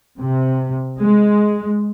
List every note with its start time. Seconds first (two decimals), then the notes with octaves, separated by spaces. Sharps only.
0.18 C3
0.99 G#3